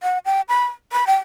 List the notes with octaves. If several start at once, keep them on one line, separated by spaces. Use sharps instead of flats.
F#5
G5
B5
B5
G5